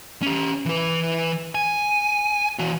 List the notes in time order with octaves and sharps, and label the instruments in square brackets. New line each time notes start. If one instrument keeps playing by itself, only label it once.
[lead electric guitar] C#4 G4
E3 B4
G#5
E3 F#4